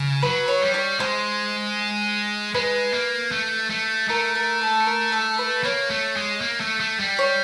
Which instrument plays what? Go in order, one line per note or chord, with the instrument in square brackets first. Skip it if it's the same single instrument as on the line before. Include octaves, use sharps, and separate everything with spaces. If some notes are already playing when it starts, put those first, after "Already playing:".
Already playing: [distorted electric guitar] C#3
[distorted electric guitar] F#3 [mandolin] B4
[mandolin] C#5
[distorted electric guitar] G3
[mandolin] C#5
[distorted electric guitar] G#3 [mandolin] C5
[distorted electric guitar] G#3 [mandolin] B4
[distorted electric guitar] A#3
A3
A3
[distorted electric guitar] A3 [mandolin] A#4
[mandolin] A#4
A4
A#4
A4
B4
[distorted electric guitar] A#3 [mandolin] C#5
[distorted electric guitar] A3
G#3
A#3
A3
A3
G3
[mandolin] C#5